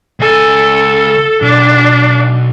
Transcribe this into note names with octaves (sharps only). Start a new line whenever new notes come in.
C#2 A4 G#5
B1 D4